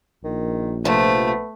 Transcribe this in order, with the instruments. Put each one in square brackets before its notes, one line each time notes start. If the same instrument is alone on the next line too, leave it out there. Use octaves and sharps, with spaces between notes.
[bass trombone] A#1 [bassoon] D#3
[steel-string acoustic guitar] C3 F3 [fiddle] A3 [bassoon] B3